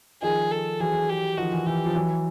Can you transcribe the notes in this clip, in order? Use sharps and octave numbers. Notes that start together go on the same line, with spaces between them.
D#3 F3 G#4
A4
E3 F#3 G#4
G4
D#3 F3 F#4
E3
E3 G4
F3
E3 F#3